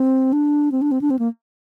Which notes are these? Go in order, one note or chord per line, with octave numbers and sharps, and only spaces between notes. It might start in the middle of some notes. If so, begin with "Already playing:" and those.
Already playing: C4
D4
C4
D4
C4
D4
C4
A#3